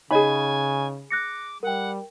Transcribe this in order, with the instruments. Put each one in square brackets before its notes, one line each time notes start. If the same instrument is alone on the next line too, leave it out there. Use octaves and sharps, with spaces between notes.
[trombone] C#3 [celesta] D#4 C#5 D#5 [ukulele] G#4 B5 [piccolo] G#5
[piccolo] D6 [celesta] F#6 A#6 C#7
[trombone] G3 [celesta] A#4 G5 [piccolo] F#5